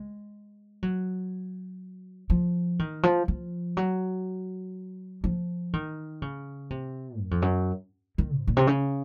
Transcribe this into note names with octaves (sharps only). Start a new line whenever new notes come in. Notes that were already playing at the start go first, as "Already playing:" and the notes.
Already playing: G#3
F#3
F3
D#3
F3
F3
F#3
F3
D#3
C#3
C3
F#2
F2
F#2
D#3
G#2
A#2
C3
C#3